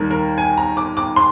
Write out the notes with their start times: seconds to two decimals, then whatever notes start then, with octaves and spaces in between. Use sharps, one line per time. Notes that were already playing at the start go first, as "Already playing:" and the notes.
Already playing: D#2 D#3 G3 A#4
0.11 A#4
0.38 G#5
0.57 A#5
0.77 D6
0.97 D6
1.16 C6